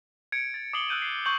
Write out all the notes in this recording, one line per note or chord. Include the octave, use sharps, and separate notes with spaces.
G#6 C#7 D7
G#6 A6
D6 D#6 C7 C#7 F#7 G7
E6 F#6 G6 D#7
C7
C#6 G6 F#7